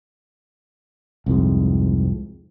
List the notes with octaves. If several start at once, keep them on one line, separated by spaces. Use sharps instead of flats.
C2 F2 G#2